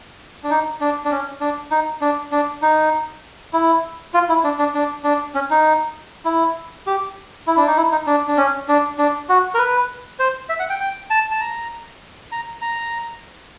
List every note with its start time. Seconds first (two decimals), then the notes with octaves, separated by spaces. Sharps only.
0.44 D4
0.50 D#4
0.81 D4
1.05 D4
1.11 C#4
1.41 D4
1.71 D#4
2.01 D4
2.32 D4
2.62 D#4
3.53 E4
4.14 F4
4.29 E4
4.44 D4
4.59 D4
4.75 D4
5.04 D4
5.35 C#4
5.50 D#4
6.25 E4
6.87 G4
7.47 E4
7.57 D4
7.67 D#4
7.77 E4
7.92 D#4
8.07 D4
8.28 D4
8.37 C#4
8.68 D4
8.98 D4
9.29 F#4
9.54 A#4
9.59 B4
10.19 C5
10.49 E5
10.59 F#5
10.70 G5
10.80 G5
11.10 A5
11.31 A5
11.41 A#5
12.32 A#5
12.62 A#5